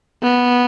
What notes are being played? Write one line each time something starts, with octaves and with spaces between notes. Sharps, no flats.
B3